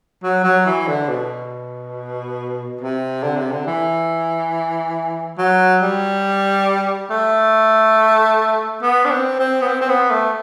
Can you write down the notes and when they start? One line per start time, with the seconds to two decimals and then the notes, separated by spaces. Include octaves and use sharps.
0.23 F#3
0.44 F#3
0.66 E3
0.87 D3
1.09 B2
2.81 C3
3.23 D3
3.37 C3
3.51 D3
3.67 E3
5.38 F#3
5.82 G3
7.10 A3
8.82 B3
9.05 D4
9.10 C4
9.39 C4
9.62 B3
9.68 C4
9.81 C4
9.89 B3
10.11 A3